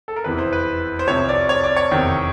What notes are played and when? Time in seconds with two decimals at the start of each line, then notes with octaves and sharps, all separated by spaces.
0.08 A4
0.16 A#4
0.24 F1 E2 C3 E3 B4
0.39 C5
0.53 B4
0.99 C5
1.07 C2 C3 F3 C#5
1.29 D5
1.49 C#5
1.64 D5
1.77 C#5
1.91 F1 E2 C3 D#3